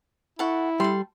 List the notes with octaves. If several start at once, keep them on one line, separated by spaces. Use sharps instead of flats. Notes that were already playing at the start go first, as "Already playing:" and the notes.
E4 A4 F#5 C#6
G3 A4 C6